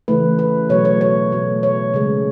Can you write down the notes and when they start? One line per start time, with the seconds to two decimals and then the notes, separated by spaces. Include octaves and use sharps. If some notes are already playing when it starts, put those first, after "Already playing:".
0.08 C#3 E3 A3 B4
0.39 B4
0.69 B2 F#3 A3 C#5
0.85 C#5
1.01 C#5
1.32 B2 A3
1.63 C#5
1.94 C#3 G#3